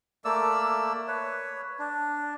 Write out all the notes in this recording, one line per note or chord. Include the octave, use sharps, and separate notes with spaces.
A3 A#3 D5 E6
B4 C#5
D4